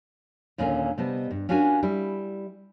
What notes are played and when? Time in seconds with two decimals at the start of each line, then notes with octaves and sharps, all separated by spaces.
0.58 D#2 A#2 D3 A#3 C#4 G#5
0.98 C3 G3 B3 D#5 A5
1.31 G2
1.49 C#4 D4 F4 F#4 A#4 G#5
1.83 G3 E4